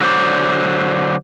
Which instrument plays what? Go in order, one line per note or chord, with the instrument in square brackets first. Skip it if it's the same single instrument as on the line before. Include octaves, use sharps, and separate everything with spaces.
[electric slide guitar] D3 F#3 C5 D5